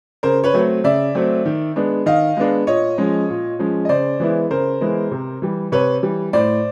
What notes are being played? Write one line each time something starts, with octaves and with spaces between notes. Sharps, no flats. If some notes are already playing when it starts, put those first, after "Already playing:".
C#3 A#4 C5
B4 C#5
F#3 A3 C4
C#3 D5 E5
F#3 A3 C4
D#3
G#3 B3 D4
D#3 D#5 F5
G#3 B3 D4
A#2 C#5 D#5
F3 G#3 C#4
A#2
F3 G#3 C#4
D#5
C#3 C5 D5
E3 G#3 B3 E4
C#3 A#4 C5
E3 G#3 B3 E4
C3
E3 G3
C3 B4 C#5
E3 G3
A2 C5 D5